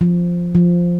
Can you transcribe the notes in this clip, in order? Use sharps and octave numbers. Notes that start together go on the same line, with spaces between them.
F3
F3